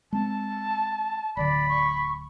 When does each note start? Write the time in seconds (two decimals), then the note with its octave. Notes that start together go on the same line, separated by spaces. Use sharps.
0.13 G#3 C4 A5
1.37 D1 D3 D5 B5
1.69 C#6